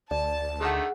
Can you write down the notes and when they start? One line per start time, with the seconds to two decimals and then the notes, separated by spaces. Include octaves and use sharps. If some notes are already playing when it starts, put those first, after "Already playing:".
0.11 D2 D5 A5
0.61 D3 D#3 A3 G#4 F#5